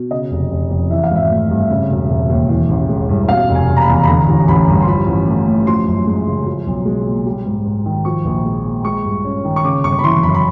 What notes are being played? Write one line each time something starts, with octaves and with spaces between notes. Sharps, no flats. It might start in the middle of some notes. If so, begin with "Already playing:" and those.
Already playing: B2
C#3 D#5
F1
F1
F2
E3 E5
F5
G#1
E5
A3
G2
C#3
E1
E1
D#2
E3
A1
G#3
G2
B2 F5
F1
G#5
F1
A#5
B5
E2
B5
D3 A#5
A1
A1 B5
G2
C6
F3 B5
A1
A3
A2
F3 C6
F#2
G#3
C#3
F3
B1
G#3
A#2
G3
G#2
G#2
D#3
F3 C#6
A#1
G#3
A#2
G#3 C#6
G2
C#4
D#3
C#6
C#3 D6
G1 C#6
B5
E3 C6
F#2 B5
B5